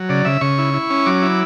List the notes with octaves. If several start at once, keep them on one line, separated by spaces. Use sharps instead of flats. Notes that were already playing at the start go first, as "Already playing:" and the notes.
Already playing: F#3
C#3 D5
C#3 E5
C#3 C#6
E4
E4
C#4
F#3 D6
E4